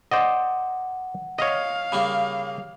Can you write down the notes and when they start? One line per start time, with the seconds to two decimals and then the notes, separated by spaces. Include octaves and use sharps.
0.11 C5 D5 D#5 F#5
1.39 C#5 D#5 F5
1.92 C#3 G3 A#3 B5